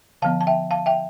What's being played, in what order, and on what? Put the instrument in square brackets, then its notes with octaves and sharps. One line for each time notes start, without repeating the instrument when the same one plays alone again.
[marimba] D3 F3 B3 F5 A5
A5
E5 G5
F5 A5
E5 G5